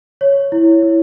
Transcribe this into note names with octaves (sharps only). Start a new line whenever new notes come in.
C#5
E4
E4